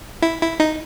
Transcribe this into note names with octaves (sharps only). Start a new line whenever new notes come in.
E4
E4
D#4